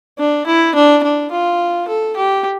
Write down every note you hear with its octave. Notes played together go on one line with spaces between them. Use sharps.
D4
E4
D4
D4
F4
A4
G4